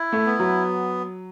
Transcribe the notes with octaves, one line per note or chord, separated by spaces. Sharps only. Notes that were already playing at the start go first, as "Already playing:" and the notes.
Already playing: E4
A3
B3
F#3